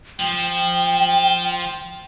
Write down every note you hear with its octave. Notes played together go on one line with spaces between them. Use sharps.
F3 G5